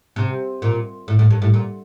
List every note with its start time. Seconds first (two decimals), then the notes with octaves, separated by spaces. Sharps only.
0.16 C3
0.62 A#2
1.08 A2
1.19 A2
1.30 G2
1.42 A2
1.54 A#2